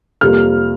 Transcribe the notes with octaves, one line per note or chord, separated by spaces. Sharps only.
F2 C3 G3 A#3 F6